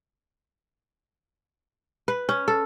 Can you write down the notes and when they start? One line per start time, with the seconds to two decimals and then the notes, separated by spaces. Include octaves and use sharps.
2.08 B4
2.29 C#4
2.48 A4